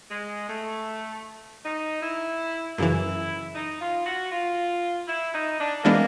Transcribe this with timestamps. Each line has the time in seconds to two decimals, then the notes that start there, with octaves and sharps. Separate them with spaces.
0.11 G#3
0.49 A3
1.64 D#4
2.02 E4
2.78 F#2 C#3 E3 E4
3.55 D#4
3.81 F4
4.05 F#4
4.32 F4
5.08 E4
5.34 D#4
5.59 D4
5.84 E3 G#3 A#3 B3 D4